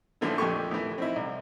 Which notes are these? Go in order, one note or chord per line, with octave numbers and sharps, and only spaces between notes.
A#2 D3 E3 F3 A3
A#1 F2 A3 G4 C#6
A2 E3
C4 D#4 E4
C2